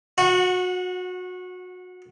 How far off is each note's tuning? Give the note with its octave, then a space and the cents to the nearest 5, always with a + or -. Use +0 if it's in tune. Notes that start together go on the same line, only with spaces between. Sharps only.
F#4 -25 F#5 +0